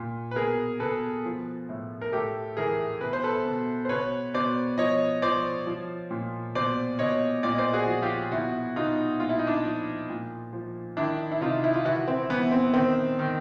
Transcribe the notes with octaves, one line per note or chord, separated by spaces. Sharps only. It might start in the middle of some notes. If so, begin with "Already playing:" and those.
Already playing: A#2
B4
B2 G#4 A#4
B2 A4 B4
F3
A2
A#4
A2 G4 A4
E3 G#4 A#4
B2 B4
C5
A4 B4
B2
C5
B2 B4 C#5
B2 C5 D5
F3 C#5 D#5
F3 C5 D5
F3
A#2
B2 C5 D5
B2 C#5 D#5
A#2 D5
D#5
C5 D5
F#4 G#4
F3
F4 G4
B2 E4 F#4
B2 D#4 F4
A#2 F4
E4
D#4
D4 E4
F3
A#2
F3
D#3 D4 E4
E4
C3 D#4 F4
E4
F4
E3 E4 F#4
C4
E3 B3
C4
D#3 C4
D#3